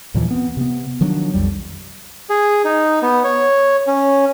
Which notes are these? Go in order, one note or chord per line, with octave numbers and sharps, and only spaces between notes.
D#2 A#2 E3 F3
B3 C4
C3 B3
D#3 F3 F#3 D4
B1 F2 G3
G#4
D#4
B3
C#5
C#4